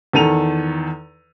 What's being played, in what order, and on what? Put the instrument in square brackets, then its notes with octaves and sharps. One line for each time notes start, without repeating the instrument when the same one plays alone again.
[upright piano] E2 D#3 A4 D#7 F7